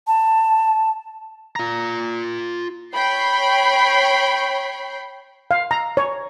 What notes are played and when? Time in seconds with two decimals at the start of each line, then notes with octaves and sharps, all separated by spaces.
0.07 A5
1.56 F4 A#5
2.94 C#5 G5 B5 C7
5.51 F5
5.71 A#5
5.97 C#5